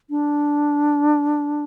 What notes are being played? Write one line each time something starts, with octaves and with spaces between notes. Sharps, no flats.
D4